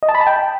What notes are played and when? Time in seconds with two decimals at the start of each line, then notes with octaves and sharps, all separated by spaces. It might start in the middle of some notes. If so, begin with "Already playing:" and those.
0.03 D#5
0.09 A5
0.15 B5
0.21 A5
0.27 G5